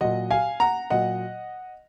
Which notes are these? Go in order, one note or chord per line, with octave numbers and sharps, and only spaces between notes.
A#2 F#3 D#5 F#5
F5 G#5
F#5 A#5
A#2 F#3 D#5 F#5